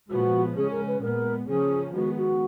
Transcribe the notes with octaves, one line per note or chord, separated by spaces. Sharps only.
A#2 F3 G#3 B3 F#4
C#3 G#3 C#4 G#4
A#4
B4
A#2 G#3 B3 A#4
C#3 F3 A#3 C#4 G#4
D#3 G#3 B3 F#4
F#4